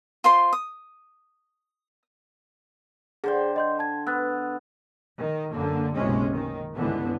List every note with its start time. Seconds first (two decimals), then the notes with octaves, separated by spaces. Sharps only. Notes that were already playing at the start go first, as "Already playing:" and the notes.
0.24 F4 C5 C6
0.53 D#6
3.24 D3 G#4 C5 G5
3.56 D#5 C6 G6
3.79 A5 G#6
4.07 B3 E6 F#6 A6
5.16 D#3
5.51 F#2 D3 A#3
5.94 F#1 B1 C3 G#3 C#4
6.34 D#3
6.76 G1 C#2 G#2 D3 E3 B3